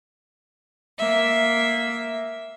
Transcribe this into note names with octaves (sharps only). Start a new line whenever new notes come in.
A#3 E5